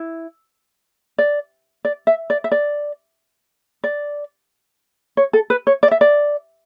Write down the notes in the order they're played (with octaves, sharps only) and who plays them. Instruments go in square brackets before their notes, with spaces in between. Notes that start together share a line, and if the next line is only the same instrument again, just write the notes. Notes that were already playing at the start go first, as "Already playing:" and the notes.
Already playing: [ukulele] E4
D5
D5
E5
D5
E5
D5
D5
C#5
A4
B4
C#5
D5
E5
D5